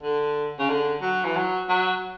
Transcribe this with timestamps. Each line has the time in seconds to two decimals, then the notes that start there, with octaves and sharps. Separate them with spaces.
0.03 D3
0.59 C#3
0.69 D3
1.02 F#3
1.25 E3
1.36 F#3
1.69 F#3